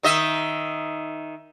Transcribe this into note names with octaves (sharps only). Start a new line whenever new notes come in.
D#3 D#5 E5